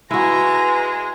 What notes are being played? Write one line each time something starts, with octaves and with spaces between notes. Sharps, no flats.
G#3 E4 F#4 B4 G#5 A#5